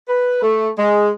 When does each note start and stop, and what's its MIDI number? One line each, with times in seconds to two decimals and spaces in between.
0.09 0.41 71
0.42 0.68 57
0.78 1.10 56